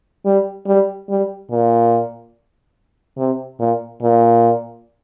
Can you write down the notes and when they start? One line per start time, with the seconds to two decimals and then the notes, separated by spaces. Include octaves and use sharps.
0.25 G3
0.67 G3
1.09 G3
1.50 A#2
3.17 C3
3.59 A#2
4.02 A#2